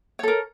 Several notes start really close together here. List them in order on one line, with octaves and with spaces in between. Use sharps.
C#5 A4 A#4